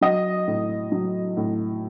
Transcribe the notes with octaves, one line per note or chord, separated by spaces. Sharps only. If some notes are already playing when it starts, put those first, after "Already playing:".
F#3 D#5
A2
F#3
A2